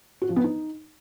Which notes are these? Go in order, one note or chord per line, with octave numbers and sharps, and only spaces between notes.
F#4
F3
B3
D#4